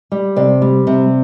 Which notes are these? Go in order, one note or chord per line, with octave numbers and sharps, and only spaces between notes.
G3
C3 D5
G3
C3